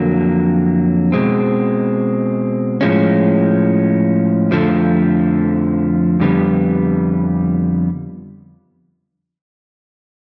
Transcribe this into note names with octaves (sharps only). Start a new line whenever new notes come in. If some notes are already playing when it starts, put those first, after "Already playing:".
Already playing: F2 D3 F#3 A#3
B2 G#3 C4
A2 F3 G#3 C#4
F2 D3 F3 A3
F2 D3 G3 B3